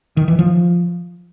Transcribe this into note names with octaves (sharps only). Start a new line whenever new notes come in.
D#3
E3
F3